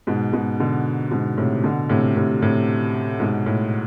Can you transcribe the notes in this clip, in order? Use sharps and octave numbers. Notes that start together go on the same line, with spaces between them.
G#2 B2
G#2 B2
B2 D3
G#2 B2
A2 C3
B2 D3
A2 C3
A2 C3
A2 C3
G#2 B2
A2